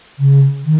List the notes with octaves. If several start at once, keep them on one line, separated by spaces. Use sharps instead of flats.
C#3
D#3